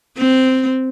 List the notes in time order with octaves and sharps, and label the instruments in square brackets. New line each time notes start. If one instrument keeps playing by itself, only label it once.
[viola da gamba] C4